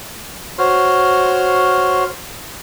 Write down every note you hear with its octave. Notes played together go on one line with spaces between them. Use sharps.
F#4 C5 C#5 C6 F6